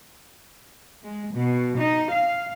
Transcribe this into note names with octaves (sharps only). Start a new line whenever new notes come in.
G#3
B2
D#4
F5